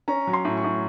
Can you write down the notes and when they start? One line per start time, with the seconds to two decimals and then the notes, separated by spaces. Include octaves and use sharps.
0.08 C#4 A#5
0.27 F#3
0.33 C6
0.45 A2
0.57 C#6
0.64 A2